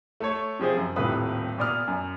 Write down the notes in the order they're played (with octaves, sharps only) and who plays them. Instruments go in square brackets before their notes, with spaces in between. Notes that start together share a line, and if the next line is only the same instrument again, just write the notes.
[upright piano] A3 A4 C#5
C3 F3 G#4 C5
F#2
D#1 A2 C3 G3 B4 D#6
A#2 B3 D5 D#6 F6
F#2